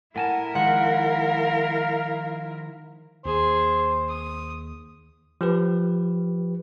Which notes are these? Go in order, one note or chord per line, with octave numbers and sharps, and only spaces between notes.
A2 E4 A#4 F#5 G#5 A5
D#3 F3 G#3 F5 F#5
D#2 G#4 C5
D#6
F3 G4 B4